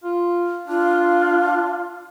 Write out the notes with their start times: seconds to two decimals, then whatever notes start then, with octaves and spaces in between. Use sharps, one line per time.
0.04 F4
0.68 D4 F4